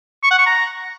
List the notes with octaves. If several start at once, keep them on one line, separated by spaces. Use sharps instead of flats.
C#6
F#5
C#6
A#5